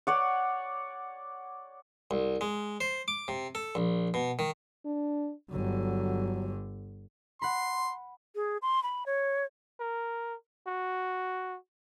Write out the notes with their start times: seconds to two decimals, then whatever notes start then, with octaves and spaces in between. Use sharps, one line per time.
0.07 C#5 D5 F#5
2.11 C2
2.41 G#3
2.81 C5
3.08 D6
3.28 C3
3.55 A4
3.75 A#1
4.14 B2
4.39 D#3
4.85 D4
5.50 G1 D3 F#3
7.42 F#5 B5 C6
8.35 G#4
8.62 C6
8.83 B5
9.06 C#5
9.80 A#4
10.67 F#4